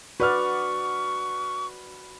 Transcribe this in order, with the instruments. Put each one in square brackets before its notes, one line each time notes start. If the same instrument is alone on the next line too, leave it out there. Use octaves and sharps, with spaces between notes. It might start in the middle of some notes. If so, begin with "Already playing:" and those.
[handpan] F#4 D5 [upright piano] B4 F6 [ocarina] C#6